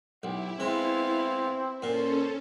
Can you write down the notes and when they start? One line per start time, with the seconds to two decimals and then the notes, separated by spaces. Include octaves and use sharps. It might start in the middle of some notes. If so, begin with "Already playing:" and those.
0.23 B1 E4 G4
0.60 G#3 B3 C4 F5
1.82 A#2 C#4 A4 C5